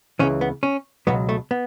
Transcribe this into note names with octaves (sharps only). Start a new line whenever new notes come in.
C#2 C#3 E3 C#4
B3
C#4
C#2 B2 F#3 B3
A3
B3